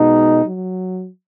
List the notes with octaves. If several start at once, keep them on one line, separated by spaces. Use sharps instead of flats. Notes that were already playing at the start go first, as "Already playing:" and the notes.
Already playing: B2 G#3 D#4
F#3